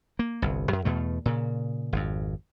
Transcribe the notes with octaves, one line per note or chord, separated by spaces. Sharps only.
A#3
G1 C2
F#2
E2 B2 A3
A#2 C#3
G#1 F2